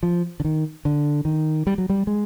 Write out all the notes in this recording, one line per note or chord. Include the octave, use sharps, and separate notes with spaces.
F3
D3
D#3
D3
D#3
G3
F#3
G3
G#3